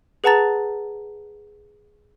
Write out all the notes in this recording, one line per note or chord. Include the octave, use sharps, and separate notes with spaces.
G#4 B4 F#5 A5 A#5 A6